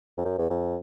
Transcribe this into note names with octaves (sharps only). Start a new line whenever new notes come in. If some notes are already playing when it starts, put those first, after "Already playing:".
F2
F#2
E2
F2